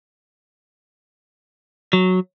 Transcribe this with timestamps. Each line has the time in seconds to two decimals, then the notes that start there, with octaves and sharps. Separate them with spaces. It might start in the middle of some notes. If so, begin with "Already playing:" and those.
1.93 F#3